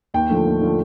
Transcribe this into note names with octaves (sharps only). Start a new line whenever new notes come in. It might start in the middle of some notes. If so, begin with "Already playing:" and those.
D#2 G5
D3 F3 A3
D#2
D3 F3 A3